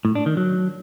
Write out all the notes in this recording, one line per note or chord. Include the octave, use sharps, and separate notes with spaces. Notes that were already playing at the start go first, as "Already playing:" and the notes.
A2
D4
D#3
F#3